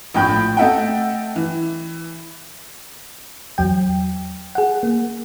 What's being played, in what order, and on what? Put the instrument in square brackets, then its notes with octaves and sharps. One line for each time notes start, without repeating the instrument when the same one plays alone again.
[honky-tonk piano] A#1 A2 G5 B5 G6
A3 A4 D#5 E5 F#5 G5
E3
[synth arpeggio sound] E2 F#3 G5
G#4 F#5
A#3